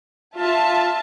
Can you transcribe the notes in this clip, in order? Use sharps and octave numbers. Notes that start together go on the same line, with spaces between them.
F4 E5 A5